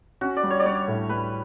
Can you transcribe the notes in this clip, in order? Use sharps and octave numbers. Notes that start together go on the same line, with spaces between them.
C#4 F#4
D5
G3
C#5
D5
G3 C#5
A2
G3 B4